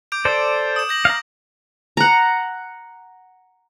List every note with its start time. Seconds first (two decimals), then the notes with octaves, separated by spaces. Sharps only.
0.12 D6 G6 D7
0.25 A4 C5 D5
0.76 D#6 E7
0.89 G6 A#6 F#7
1.05 F5 A#5
1.97 F#5 A#5